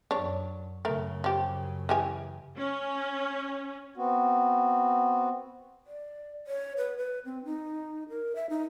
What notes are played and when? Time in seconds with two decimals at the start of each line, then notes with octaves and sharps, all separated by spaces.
0.11 F#2 D4 C#5
0.85 F#2 C#3 A3 A#4
1.24 F3 G4
1.89 E3 G4 G#5
2.57 C#4
3.97 B3 C4 F#4
5.87 D5
6.47 C#5
6.77 B4
6.98 B4
7.25 C4
7.45 D#4
8.09 A#4
8.36 E5
8.50 D#4